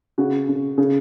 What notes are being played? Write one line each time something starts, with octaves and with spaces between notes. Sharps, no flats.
C#3 F#4
C#3
C#3